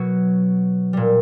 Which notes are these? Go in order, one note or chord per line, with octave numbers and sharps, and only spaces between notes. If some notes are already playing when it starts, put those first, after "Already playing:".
Already playing: B2 F#3 F#4
A#2 G3